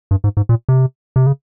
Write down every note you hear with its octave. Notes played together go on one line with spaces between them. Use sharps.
G2
G#2
G#2
A#2
C3
C3
C#3